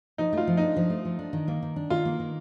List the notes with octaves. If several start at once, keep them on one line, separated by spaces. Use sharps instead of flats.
F3 D#4
A3 F4
F3
D4 D#4
F3
A3
F3
D4
D#3
A#3
D#3
D4
D#3 F4
A#3
D#3